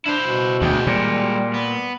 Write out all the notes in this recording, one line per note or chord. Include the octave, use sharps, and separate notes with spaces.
D4 E4 C5
B2
D2 G#3 G5
A#2 G3
B3